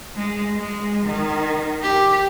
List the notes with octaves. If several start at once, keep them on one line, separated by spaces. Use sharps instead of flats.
G#3
G#3
D#3
G4